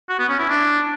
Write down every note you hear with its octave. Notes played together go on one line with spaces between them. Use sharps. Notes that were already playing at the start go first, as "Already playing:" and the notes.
F#4
B3
C#4
E4
D4